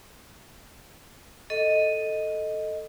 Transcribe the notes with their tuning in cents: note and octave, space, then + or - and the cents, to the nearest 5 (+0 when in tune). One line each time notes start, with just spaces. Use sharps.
A4 +5 D#5 +0